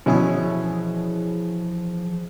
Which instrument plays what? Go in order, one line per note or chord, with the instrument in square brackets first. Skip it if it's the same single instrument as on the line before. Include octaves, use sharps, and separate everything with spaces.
[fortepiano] B2 C#4 [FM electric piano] E3 E4 G#4 [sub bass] F3